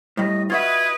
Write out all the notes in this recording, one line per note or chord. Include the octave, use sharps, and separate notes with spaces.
A2 G3 D#5
F4 F#4 B4 D#5 E5 D#6 G#6